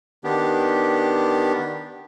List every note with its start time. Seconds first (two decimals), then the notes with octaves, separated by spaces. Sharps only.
0.24 D#3 B3 D4 G4